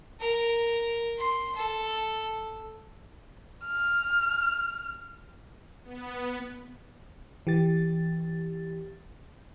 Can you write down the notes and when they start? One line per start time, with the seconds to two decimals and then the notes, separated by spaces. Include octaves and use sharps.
0.20 A#4
1.18 C6
1.56 A4
3.64 F6
5.84 B3
7.47 E3 G4 A6